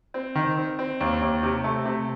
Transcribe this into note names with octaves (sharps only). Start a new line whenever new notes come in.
C4
D#3
C4
C4
D#2
D#2
C3
A3
C3